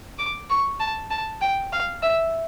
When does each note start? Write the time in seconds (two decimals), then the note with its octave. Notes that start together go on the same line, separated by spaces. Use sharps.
0.18 D6
0.50 C#6
0.80 A5
1.10 A5
1.41 G5
1.72 F5
2.02 E5